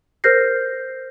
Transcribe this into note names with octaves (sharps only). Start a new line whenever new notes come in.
A#4 C5 F6 G6 A#6 C7